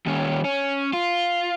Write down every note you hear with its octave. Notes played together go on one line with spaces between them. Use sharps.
D#2 C#4
C#4
F4